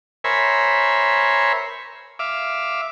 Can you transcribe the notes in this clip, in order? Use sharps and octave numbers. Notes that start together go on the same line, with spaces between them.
A#4 C5 C#5 E5 G#5 B5
E5 F5 D6